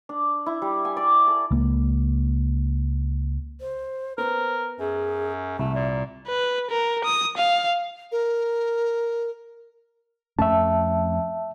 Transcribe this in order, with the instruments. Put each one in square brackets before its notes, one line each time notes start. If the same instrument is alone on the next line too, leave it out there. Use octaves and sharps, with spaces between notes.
[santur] D4
E4
G3
G#5
D5
A4
[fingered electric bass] C#2 A#3
[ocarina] C5
[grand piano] B3 [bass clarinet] A#4 [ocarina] C5
[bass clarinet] F#2 [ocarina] G#4
[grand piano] C2 [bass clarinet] A3 [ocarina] E5
[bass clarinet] A#2
[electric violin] B4
A#4
D#6
F5
[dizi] A#4
[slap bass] F2 A3 C#4 [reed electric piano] E5 A5